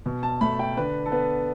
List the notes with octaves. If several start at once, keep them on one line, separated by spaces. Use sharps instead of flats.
B2
A5
A3 B5
G5
D3 B4
A4
B3 B4